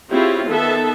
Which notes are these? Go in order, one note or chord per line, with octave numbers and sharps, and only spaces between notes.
C4 E4 F4 G4 G#4 C#5
D#3 B3 A4 E5 A5